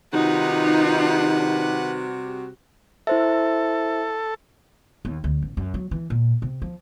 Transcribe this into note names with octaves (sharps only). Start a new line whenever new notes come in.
C3 D#3 G3 D#4 F4 F#4 B4 F#5
E4 A4 C5 E5
D#2
D2
A1
F#2
F#3
E3
A#2
C3
F3